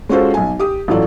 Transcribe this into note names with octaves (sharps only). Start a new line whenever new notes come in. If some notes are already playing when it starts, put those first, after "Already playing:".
G#3 C#4 F4 F#4 A4 C5
B1 G#5
G4 D#6
A1 A2 F#3 F4 A4 D5